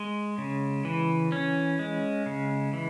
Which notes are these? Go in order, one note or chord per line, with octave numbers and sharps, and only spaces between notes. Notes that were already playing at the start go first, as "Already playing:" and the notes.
Already playing: G#3
C#3
E3
C#4
G#3
C#3
E3